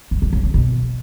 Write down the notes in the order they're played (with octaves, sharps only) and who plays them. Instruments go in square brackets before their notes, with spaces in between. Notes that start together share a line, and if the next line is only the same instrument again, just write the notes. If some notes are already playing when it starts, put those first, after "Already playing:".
[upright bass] G2
E2
C#3
C#3
B2